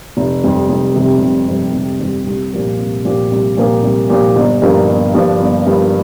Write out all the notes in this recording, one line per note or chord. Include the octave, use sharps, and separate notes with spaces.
F1
F2 C3 G3
F1
F2 C3 G3
F1
F2 C3 G3
F1
F2 C3 G3
C2
A#2 F3 A#3 G4
C2
A#2 F3 A#3 G4
C2
A#2 F3 A#3 G4
C2
A#2 F3 A#3 G4
G1
G2 F3 A#3 D4
G1
G2 F3 A#3 D4
G1
G2 F3 A#3 D4